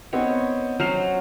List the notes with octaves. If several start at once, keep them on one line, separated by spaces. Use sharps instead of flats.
B3 C4 D#4 C#5
F#3 C#4 C5 F6 C7 F7